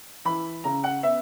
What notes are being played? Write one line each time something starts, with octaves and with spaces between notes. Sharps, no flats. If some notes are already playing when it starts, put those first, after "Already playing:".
E3 B5
C#3 A#5
F#5
B3 E5